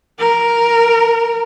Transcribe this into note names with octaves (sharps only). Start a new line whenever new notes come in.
A#4